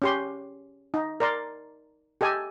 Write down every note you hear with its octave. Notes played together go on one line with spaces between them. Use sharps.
C#4 G4 C6
D#4
A#4 D5 C6
G4 A4 D#5 G#5